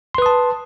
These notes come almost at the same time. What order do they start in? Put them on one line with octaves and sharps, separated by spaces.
C6 B4 D#6 A5